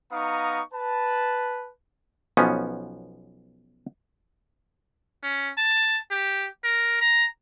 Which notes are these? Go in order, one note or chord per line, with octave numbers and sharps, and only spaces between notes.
B3 D#4 F5 A#5 C#6 D#6
B4 A5
B1 F3 B3 C#4
C#4
A5
G4
A#4
A#5